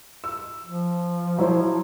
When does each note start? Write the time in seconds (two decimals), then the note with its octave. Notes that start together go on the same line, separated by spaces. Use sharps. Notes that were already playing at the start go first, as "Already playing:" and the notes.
0.24 E6
0.65 F3
1.38 F#3 E4 C5